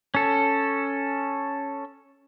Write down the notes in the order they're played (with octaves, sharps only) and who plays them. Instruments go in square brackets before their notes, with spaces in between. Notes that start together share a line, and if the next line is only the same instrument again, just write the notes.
[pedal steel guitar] C#4 A4